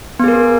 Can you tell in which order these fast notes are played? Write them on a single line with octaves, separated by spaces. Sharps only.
B3 G#4 A#4